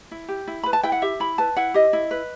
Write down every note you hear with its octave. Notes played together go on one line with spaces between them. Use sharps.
E4
G4
E4
B4 B5
A5
E4 G5
F#5
G4 E5
E4 B5
B4 A5
E4 F#5
G4 D#5
E4
B4